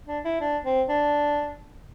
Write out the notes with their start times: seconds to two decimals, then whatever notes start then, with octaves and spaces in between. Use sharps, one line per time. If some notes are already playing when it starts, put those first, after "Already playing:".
0.08 D4
0.25 E4
0.41 D4
0.65 C4
0.89 D4